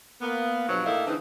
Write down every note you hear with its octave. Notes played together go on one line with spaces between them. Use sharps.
A#3 B3
G2 B2 F3 F#3
A2 A#3 D#4 E4 A4
D3 E3 G#3 C4 D#4